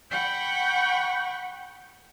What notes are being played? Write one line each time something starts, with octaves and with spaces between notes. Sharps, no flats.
F#5 G5 B5 C#6